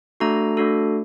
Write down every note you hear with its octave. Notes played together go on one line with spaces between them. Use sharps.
A3 D4 F#4 A4 A#5
A3 D4 F#4 A4